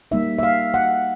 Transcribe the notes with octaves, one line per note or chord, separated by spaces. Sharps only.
G3 A#3 D#4 E5
E5
F5
F#5